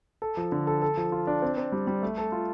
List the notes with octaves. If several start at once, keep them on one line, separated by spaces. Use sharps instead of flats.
A4
F3
D3
A4
A4
F3
F4
D4
C4
C4
G3
G3
A3
A4
F4